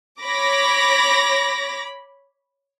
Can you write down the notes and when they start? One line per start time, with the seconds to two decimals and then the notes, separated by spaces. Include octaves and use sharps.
0.22 C#5 B5 D6 A#6